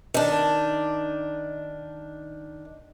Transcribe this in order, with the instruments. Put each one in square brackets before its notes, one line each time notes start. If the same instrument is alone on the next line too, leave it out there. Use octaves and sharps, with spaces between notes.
[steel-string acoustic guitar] D#3 D4